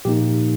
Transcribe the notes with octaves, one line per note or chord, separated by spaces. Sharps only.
A#2 F3 A#3 D#4 G4